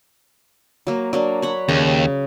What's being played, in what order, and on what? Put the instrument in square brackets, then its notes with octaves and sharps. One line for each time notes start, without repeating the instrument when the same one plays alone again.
[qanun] F#3 A#3
F#3 A#3 D4
C#5 F#5 B5
[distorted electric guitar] D#2 [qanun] C#3